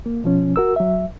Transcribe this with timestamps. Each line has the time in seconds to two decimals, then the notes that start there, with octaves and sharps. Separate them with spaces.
0.06 A#3
0.24 B2 F3 C#4
0.56 F#4 A#4 E6
0.76 F#3 E5